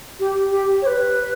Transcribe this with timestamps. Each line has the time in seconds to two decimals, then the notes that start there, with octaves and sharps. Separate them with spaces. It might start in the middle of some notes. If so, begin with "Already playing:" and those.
0.19 G4
0.51 G4
0.82 C#5
0.87 B4